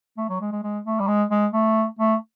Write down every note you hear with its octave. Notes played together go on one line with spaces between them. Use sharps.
A3
F#3
G#3
G#3
G#3
A3
G3
G#3
G#3
A3
A3